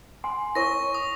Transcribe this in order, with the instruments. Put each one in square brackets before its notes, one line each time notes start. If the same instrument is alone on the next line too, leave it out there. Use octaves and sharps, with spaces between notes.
[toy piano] F#5 G#5 C6
[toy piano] E4 A#4 C#5 [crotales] C#6 A#6
[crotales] D#6